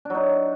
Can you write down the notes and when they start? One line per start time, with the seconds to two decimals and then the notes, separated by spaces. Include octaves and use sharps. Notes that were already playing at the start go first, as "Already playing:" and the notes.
0.05 D4
0.10 F#3
0.15 D#4